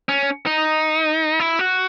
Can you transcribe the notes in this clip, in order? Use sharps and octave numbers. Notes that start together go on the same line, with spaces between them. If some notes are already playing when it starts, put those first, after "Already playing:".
C#4
D#4
E4
F#4